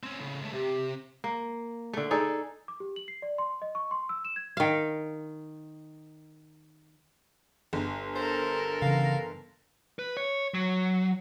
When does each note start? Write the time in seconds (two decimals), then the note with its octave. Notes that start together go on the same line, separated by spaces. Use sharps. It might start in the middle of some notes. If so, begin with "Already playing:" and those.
0.03 C4 C#4
0.20 A2 C#3
0.41 C#2 A3
0.53 C3 G4
1.24 A#3
1.93 D3 A3
2.11 D#4 G#4 A4 D5
2.68 D6
2.80 G4
2.96 F#7
3.08 C7
3.22 D5
3.38 C6
3.62 D#5
3.75 C#6
3.91 C6
4.09 E6
4.25 E7
4.36 G#6
4.57 D#3 F5
7.73 G1
8.16 A4 A#4 C5
8.82 C#3 E3 F5
9.99 B4
10.17 C#5
10.54 F#3